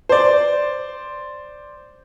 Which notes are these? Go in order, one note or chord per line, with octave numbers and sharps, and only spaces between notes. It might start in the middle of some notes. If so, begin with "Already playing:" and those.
C5 D5